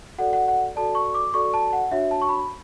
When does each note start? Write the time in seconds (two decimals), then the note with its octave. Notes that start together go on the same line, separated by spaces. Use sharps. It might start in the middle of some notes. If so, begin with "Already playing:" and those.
0.18 F#4 A4 D5 F#5
0.33 F#5
0.48 F#5
0.76 F#4 A4 D5 A5
0.95 C#6
1.15 D6
1.34 F#4 A4 D5 C#6
1.54 A5
1.73 F#5
1.91 D4 F#4 C#5 E5
2.11 A5
2.22 C#6
2.29 B5